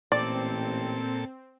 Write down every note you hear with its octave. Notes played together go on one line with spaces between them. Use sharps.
A1 A#2 C4 A4 D5